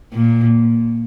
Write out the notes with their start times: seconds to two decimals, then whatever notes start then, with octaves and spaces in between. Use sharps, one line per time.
0.13 A#2